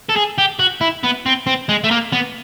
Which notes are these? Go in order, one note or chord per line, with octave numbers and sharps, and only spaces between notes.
A4
G#4
G4
F#4
E4
B3
C4
C4
G#3
A3
A#3
B3